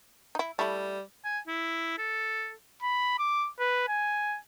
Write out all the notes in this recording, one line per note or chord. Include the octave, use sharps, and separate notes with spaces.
D#4 E4
G3 A3 E4
G#5
E4
A4
B5
D6
B4
G#5